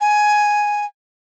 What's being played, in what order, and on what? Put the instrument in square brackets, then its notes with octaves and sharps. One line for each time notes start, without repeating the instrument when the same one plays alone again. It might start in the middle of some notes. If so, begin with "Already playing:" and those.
[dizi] G#5